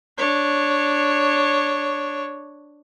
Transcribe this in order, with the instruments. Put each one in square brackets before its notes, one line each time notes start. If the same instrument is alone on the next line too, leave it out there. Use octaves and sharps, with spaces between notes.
[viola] D4 C#5